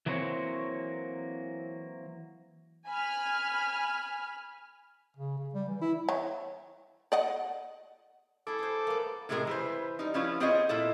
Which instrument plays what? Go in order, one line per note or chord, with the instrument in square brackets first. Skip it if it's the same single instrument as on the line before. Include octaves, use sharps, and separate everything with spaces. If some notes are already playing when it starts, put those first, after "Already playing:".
[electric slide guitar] E3 F#3 A#3 C4 C#5
[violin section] G#5 B5 F6
[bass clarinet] C#3
C#3
G3
E3
E4
[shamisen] E3 C#5
D5 D#5 F#5
[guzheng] E4 G#4 [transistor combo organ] A4 D6
[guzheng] G#4 C5
A#3 B3
[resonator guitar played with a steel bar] A2 C3 E3 G#3 G#4 A#4
E3 B4 C5
G3 D#4
F3 C#4 E4 F4 B4
B3 C4 F4 G#4 C#5 D#5
A#2 E4 A4 D#5